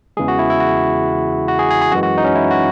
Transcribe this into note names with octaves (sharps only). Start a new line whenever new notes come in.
E2 C#3 E3 G#3 G#4
F#4
E4
E4
F#4
F#4
G#4
G#4
G#4
F#2 E3 G#3 F#4
F#4
D#4
C#4
E4
F#4